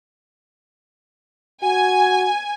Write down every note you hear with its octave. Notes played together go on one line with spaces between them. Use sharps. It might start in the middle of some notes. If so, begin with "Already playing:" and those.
F#4 G#5